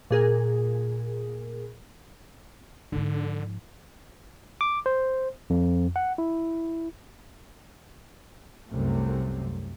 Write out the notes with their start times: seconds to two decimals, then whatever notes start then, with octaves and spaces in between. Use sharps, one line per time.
0.11 A#2 G#4 A#4
2.92 G#2 D3 F3
4.61 D6
4.86 C5
5.50 F2
5.96 F#5
6.18 E4
8.68 C2 F#2 C3 A3